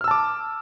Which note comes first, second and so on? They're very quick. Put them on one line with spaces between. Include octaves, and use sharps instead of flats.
F6 E6 A5 D6